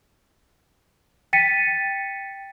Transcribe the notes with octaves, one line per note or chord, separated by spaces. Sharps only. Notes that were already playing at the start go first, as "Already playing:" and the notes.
G5 A6 B6 C#7 D#7